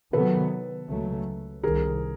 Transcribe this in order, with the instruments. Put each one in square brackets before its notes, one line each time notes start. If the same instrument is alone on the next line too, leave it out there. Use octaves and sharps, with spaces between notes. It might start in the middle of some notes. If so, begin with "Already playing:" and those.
[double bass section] C3 D#3 F#3 B3 [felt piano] A4 B4
[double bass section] C#2 C#3 F#3 A3
[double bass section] C2 C3 D#3 [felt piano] G#4 A#4